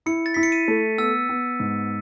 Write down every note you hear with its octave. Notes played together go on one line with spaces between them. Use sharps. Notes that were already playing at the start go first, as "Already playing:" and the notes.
E4 C#7
A6
E4 B6
C#7
D#7
A3
B3 E6
B3
G#2